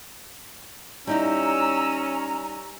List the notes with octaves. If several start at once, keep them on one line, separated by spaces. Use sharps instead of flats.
G3 C#4 D#4 E4 A#5 E6